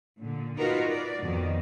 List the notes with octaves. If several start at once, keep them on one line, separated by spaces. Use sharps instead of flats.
A#2 D3
D#4 F4 F#4 A#4 B4
D5
F2 B2 D#3